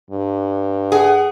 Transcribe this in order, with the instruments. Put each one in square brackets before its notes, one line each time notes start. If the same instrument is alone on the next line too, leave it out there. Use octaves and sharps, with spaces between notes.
[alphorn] G2
[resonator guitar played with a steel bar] G#4 [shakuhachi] F#5